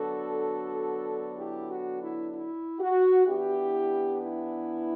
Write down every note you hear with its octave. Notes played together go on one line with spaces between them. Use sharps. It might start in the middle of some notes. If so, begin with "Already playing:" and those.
Already playing: D3 F#3 B3 D4 F#4 A4
E4 G4
F#4
E4
E4
F#4
E3 B3 D4 E4 G4
E4